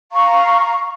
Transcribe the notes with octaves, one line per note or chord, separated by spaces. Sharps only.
F5 A#5 C#6